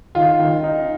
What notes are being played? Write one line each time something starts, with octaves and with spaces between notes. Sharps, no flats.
D#3 F4
D#3
D#4